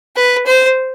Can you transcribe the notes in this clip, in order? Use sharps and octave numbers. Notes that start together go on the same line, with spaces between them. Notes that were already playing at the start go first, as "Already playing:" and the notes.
B4
C5